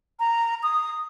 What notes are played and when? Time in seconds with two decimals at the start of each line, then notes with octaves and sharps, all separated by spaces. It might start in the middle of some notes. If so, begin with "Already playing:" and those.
0.20 A#5
0.63 D#6